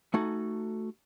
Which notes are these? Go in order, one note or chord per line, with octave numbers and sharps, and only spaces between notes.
A3 D#4 F#4 A4 G#5